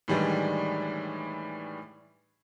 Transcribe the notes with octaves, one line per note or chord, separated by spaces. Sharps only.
A2 D#3 E3 G3 G#3 D4